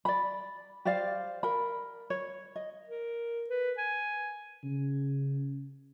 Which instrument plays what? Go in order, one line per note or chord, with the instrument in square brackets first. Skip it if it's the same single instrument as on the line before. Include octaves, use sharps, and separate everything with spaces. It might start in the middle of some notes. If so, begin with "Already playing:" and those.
[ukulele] D5 B5
G4 C5 D5 F5
A#4 B5
C#5
D#5
[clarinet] A#4
B4
G#5
[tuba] C#3